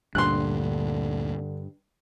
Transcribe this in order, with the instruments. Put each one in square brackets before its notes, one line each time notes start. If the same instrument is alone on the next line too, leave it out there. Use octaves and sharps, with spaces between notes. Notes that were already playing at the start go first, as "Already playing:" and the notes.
[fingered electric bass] D2 A#2 [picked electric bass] G2 [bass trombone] D3 [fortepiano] C6 F#6